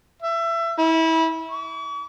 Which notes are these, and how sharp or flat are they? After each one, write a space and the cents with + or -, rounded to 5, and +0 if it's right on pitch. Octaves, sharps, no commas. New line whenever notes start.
E5 +25
E4 -25
C#6 +45